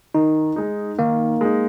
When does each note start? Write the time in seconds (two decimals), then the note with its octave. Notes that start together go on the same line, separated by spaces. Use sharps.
0.14 D#3 D#4
0.56 G#3 D#4
0.98 D#3 A#3
1.41 G#3 D#4